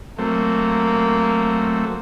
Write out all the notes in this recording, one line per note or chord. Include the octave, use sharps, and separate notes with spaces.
F#3 A3 A#3 C4